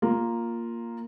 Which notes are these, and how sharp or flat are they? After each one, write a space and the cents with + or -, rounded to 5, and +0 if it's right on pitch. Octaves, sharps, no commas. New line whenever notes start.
A#3 +0 F4 +0